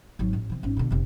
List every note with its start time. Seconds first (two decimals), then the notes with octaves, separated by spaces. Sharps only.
0.19 G#1 F#3
0.33 A1
0.50 C3 E3
0.63 G#1 C#4
0.77 B2 D3
0.91 F1 C3